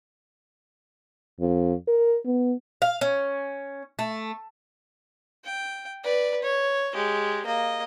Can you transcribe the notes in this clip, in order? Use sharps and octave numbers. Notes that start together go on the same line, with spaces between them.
F2
A#4
B3
F5
C#4
A3
G5
B4 D5
C#5
G#3 G4
A#3 D#5